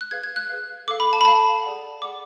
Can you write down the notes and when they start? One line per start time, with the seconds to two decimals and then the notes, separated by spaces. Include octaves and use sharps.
0.01 F#6
0.11 G#4 B4 F5 G#6
0.23 G#6
0.36 F#6
0.49 G#4 B4 F5
0.88 A4 F5 D6
1.00 B5
1.13 A5
1.21 B5
1.25 A4 F5 A5
1.63 G#4 D5 F#5
2.02 G#4 D5 F#5 D6